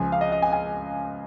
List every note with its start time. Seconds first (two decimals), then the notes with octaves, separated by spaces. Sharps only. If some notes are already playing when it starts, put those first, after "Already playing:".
Already playing: C#2 C#3 F3 G#5
0.12 F5
0.21 D#5
0.32 D#5
0.42 G#5
0.52 G#5